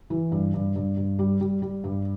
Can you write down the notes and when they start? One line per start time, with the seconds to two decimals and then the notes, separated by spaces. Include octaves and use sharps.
0.10 E3
0.32 G2
0.54 G2
0.76 G2
0.97 G2
1.19 G3
1.41 G3
1.62 G3
1.84 G2